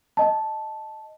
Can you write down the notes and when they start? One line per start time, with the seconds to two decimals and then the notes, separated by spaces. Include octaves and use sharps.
0.17 D#5 A5